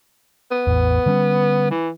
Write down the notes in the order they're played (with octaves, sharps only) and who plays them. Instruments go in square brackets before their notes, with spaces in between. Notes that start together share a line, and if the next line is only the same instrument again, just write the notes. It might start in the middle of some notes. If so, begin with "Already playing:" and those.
[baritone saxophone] B3
[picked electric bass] A1 E2
D3 G3 C#4
[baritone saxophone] E3